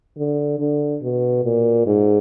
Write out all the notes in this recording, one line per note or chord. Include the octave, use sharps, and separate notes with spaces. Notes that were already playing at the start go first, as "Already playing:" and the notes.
D3
D3
B2
A#2
G#2